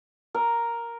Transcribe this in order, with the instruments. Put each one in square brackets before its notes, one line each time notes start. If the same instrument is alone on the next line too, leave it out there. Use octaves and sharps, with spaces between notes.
[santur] A#4